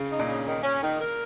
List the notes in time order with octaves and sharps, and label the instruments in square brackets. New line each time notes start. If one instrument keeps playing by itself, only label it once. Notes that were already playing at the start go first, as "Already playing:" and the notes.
Already playing: [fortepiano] C#3
[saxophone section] D#4
[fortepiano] A#2
[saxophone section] C#3
D#3
C#4
D#3
A#4